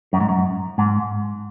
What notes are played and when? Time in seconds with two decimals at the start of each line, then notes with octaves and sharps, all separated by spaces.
0.13 F#2
0.20 G#2
0.29 F#2
0.78 G#2